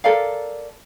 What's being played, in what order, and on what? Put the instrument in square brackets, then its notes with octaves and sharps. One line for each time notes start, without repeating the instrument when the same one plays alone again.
[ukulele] A4 A#4 D5 F5